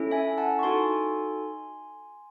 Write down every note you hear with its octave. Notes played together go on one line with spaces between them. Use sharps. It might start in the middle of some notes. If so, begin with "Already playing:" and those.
Already playing: C#4 E4 A4
E5 G#5
F#5 A5
C#6
D#4 F#4 A4 G#5 C6